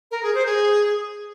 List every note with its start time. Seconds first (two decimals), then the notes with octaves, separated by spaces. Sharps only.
0.11 A#4
0.23 G#4
0.35 C5
0.46 G#4